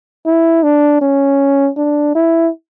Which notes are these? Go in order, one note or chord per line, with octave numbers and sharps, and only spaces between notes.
E4
D4
C#4
D4
E4